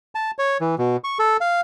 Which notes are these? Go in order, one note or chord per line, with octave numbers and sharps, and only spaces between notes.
A5
C#5
E3
B2
C#6
A4
F5